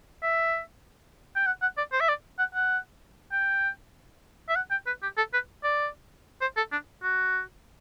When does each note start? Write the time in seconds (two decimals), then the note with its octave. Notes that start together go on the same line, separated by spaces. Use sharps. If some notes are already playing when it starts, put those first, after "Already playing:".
0.23 E5
1.35 G5
1.46 F#5
1.61 F#5
1.77 D5
1.92 C5
2.00 E5
2.08 D5
2.39 F#5
2.54 F#5
3.32 G5
4.49 E5
4.56 F#5
4.71 G5
4.86 B4
5.02 G4
5.17 A4
5.33 B4
5.64 D5
6.41 C5
6.57 A4
6.72 D4
7.03 F#4